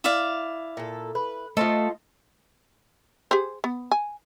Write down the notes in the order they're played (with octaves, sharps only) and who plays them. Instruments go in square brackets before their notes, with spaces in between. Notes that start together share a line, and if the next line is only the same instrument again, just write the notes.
[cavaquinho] E4 D5 F5
[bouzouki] A#2 A4
B4
[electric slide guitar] A3 [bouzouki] F4 C5 D#5 [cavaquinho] A4
[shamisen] G4 G#4 C5
B3
G#5